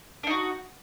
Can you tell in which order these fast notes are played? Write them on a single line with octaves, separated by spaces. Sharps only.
D4 D#4 F#4